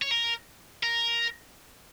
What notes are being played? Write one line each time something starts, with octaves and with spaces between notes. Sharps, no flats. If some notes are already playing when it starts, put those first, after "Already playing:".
C#5
A#4
A#4